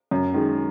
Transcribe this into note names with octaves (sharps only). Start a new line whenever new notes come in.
F#2
D#3 G#3